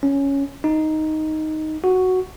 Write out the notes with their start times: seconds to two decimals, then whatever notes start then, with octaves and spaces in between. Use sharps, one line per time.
0.03 C#4
0.64 D#4
1.84 F#4